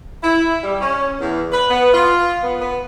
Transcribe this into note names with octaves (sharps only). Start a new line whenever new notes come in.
E4
G3
C#4
E2
B4
B3
F4
B3
B3